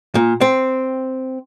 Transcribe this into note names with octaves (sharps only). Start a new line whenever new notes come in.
A#2
C4